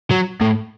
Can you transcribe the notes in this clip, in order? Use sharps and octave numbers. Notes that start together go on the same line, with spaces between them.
F#3
A2